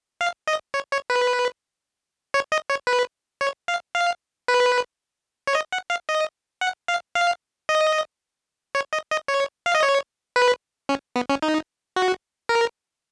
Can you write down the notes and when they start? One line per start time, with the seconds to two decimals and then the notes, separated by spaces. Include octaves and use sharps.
0.21 F5
0.47 D#5
0.74 C#5
0.92 C#5
1.10 B4
2.34 C#5
2.52 D#5
2.70 C#5
2.87 B4
3.41 C#5
3.68 F5
3.95 F5
4.48 B4
5.47 C#5
5.55 D#5
5.72 F#5
5.90 F5
6.09 D#5
6.61 F#5
6.88 F5
7.15 F5
7.69 D#5
8.75 C#5
8.93 D#5
9.11 D#5
9.28 C#5
9.66 F5
9.75 D#5
9.83 C#5
10.36 B4
10.89 C#4
11.16 B3
11.30 C#4
11.42 D#4
11.96 F#4
12.49 A#4